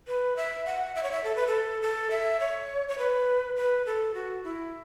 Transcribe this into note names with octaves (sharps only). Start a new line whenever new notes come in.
B4
E5
F#5
E5
C#5
E5
A4
B4
A4
A4
E5
C#5
C#5
B4
B4
A4
F#4
E4